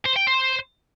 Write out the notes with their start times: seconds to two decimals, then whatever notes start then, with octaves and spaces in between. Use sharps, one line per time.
0.06 C5
0.16 G5
0.27 C5